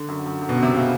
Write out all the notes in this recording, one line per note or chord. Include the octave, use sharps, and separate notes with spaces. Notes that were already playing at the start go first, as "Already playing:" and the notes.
Already playing: D3
F#2
F#2
F#2
B2
F#2
C3
C#3